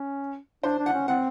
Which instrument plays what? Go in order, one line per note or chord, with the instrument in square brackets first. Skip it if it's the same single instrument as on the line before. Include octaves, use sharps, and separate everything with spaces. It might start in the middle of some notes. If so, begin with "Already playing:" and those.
Already playing: [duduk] C#4
[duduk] D4 [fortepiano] C5
[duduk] D4
[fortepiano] F#5
[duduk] C#4
[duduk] C4 [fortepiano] F#5